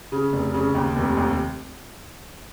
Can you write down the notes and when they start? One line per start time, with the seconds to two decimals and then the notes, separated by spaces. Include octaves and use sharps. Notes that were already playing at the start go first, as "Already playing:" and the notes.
0.12 C#3
0.33 F1
0.54 C#3
0.75 D#2
0.96 F1
1.17 D#2